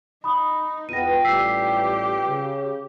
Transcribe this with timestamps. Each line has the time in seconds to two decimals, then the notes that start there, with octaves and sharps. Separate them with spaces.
0.24 D#4 B5 D#6
0.89 E2 B3 F4 B4 G5 A#6 D#7
1.25 A1 G3 G4 E6 B6 C7
2.28 C#3